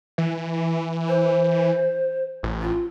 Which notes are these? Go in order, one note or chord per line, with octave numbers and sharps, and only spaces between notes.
E3
C5
A1
F4